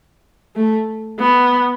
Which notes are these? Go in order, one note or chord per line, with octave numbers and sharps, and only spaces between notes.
A3
B3